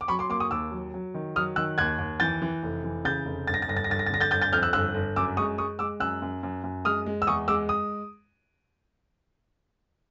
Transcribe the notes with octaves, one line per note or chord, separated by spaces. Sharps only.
D6
F#3 B5 C#6
C6 D6
A#3 C6 D6
C#6 D#6
D#2 D6 E6
F#3
F#3
D#3
F#3 D#6 F6
D#3 E6 F#6
D#2 F#6 G#6
D#2
E3 G6 A6
E3
F1
E3
C#3 G6 A6
F1
G1 A6
A#6
A6
G1 A#6
A6
A#6
G1 A6
A#6
A6
D3 A#6
G6 A6
G1 G6 A6
G6 A6
F2 F6 G6
E6 F#6
G1 E6 F#6
G1
F#2 D6 E6
G#3 C#6 D#6
G#3 C#6 D#6
G#3 D6 E6
F#2 E6 F#6
F#2
F#2
F#2
G#3 D#6 F6
G#3
E6
E2 C#6 D#6
G#3 D6 E6
D#6